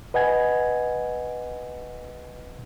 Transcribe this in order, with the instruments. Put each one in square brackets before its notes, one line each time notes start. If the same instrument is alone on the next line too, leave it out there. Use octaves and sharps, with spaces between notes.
[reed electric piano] B4 D#5 F#5 G#5 G#6